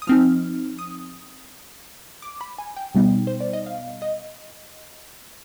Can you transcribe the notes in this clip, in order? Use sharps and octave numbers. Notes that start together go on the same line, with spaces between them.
D#6
F3 C4 D#4 F6
D#6
D6
B5
G#5
G5
B2 G3 B3 D#4
C5
D5
D#5
F5
D#5